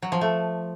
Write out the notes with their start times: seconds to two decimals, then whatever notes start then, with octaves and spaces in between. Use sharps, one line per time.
0.02 F#3
0.12 F3
0.21 A3